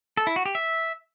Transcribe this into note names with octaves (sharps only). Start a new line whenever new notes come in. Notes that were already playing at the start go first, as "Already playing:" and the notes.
A4
E4
F#4
G4
E5